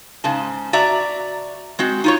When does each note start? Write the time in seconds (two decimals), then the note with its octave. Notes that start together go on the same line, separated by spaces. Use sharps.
0.24 G#2 C#3 A5
0.73 F#4 D5 E5 A#5
1.79 G#3 C4 F#4
2.04 D#4 F4 C#5